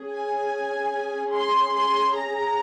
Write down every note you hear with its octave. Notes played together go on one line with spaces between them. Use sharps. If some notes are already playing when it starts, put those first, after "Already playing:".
Already playing: C#4 G#4
G#5
C6
C6
A#5